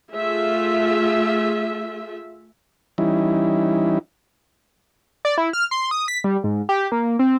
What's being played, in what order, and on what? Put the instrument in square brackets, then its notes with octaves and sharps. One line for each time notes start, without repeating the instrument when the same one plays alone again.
[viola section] A3 F4 G#4 E5
[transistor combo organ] E3 G3 C#4 D#4 E4
[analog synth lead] D5
E4
F6
C6
D#6
B6
G3
G#2
G4
A#3
C4